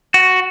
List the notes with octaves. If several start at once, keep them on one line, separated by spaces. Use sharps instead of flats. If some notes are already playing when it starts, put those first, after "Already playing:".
F#4